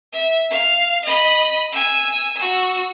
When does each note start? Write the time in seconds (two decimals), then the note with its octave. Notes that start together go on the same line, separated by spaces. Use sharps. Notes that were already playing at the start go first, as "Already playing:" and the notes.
0.12 E5
0.50 F5
1.04 D#5 B5
1.72 G#5 E6
2.36 F#4 E6